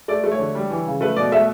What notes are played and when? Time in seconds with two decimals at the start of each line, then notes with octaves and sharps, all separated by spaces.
0.08 A3 D5
0.24 A3
0.32 C#5
0.39 D3
0.55 G3
0.70 E3
0.86 C#3
1.01 A3 B4
1.16 B2 D5
1.32 A3 E5